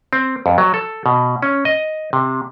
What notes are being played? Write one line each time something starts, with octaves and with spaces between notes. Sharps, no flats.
C4
F2
F#3
A4
B2
C#4
D#5
C3